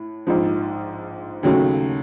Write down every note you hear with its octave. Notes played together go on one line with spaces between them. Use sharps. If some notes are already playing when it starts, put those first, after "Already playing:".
Already playing: A2
A#1 G#2 F3
D#2 C#3 F#3 A3